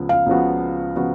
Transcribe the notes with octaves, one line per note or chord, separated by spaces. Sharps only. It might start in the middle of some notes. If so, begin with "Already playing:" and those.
Already playing: C#2 C#3 F3 B3
F5
C#2 C#3 F3 B3 F#4
C#3 F3 B3 F#4